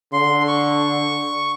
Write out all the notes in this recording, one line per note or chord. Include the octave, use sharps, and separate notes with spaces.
D3 C6
C#6